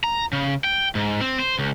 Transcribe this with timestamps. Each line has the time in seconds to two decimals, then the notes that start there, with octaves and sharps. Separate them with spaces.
0.04 A#5
0.33 C#3
0.64 G5
0.95 G#2
1.21 C4
1.39 C5
1.59 C#2